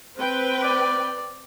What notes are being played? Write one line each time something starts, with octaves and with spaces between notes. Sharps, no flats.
C4 B4 G5
D5